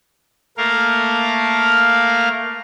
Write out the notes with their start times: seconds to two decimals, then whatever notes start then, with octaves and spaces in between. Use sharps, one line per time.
0.57 A3 A#3 A#4 F5